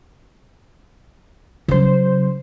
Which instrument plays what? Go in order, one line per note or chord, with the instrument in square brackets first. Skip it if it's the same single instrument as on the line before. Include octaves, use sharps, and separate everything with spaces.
[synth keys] C#3 C5 [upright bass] F#3 C#4